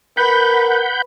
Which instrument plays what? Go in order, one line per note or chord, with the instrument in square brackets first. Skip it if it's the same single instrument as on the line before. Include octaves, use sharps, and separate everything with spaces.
[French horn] A#4 [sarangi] B4 [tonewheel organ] F#5 B5 G6